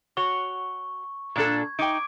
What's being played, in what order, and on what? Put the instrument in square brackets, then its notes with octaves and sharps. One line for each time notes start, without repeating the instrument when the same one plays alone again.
[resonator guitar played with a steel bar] F#4 C#5 [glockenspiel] C#6
[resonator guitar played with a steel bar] A#2 D4 A4 [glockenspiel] G#6
[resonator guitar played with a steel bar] D#4 G5 [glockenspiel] D6 D7